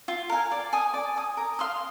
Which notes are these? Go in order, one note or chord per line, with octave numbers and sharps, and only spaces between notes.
F4
A#4 F5 G#5
D5
G#5 D#6
D5
G#5 D#6
A#4
F5 C6 D#6